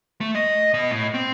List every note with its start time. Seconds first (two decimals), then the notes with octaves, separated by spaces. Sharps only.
0.21 A3
0.35 D#5
0.74 B2 D#5
0.91 A2
1.14 C4